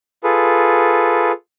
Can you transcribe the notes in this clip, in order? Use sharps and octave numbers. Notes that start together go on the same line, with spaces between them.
F4 G#4 A4 B4